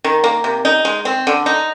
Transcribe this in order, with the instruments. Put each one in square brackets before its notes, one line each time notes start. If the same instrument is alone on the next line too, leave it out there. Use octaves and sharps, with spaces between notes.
[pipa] D#3
A#3
C3
D#4
G#3
C4
D3
D#4